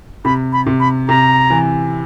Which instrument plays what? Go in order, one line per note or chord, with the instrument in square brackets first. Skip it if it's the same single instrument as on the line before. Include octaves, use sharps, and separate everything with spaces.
[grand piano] C3 [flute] B5
[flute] B5
[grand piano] C3
[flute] B5
[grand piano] C3 [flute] A#5
[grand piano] E3